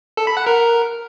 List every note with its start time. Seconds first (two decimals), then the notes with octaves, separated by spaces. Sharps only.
0.17 A4
0.27 B5
0.37 F#5
0.47 A#4